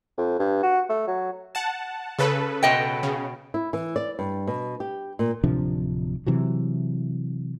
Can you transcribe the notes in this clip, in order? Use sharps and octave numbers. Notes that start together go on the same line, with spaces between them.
F2
G2
F#4
A3
F#3
F#5 A5
C#3 A4 B4
B2 D#5 G5
C#3
E4
E3
D5
G2
B2
G4
A#2
D1 C3 F3 D4
C3 E3 F#3